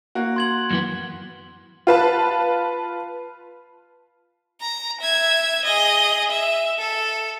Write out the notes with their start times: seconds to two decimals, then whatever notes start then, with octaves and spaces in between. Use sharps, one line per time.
0.15 A#3 F#4
0.36 C6 G#6 F#7
0.71 F#2 E3 B3
1.87 F4 B4 A5
4.61 A#5
5.01 E5 G#6
5.65 G#4 D#5
6.31 E5
6.78 A4